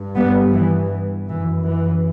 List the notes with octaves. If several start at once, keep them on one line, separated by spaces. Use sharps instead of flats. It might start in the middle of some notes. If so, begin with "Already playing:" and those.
Already playing: G2
G3 B3
E3
F#2 E3
E3